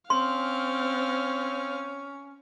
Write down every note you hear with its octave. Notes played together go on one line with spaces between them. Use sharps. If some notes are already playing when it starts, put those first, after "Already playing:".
C4 C#4 F5 C6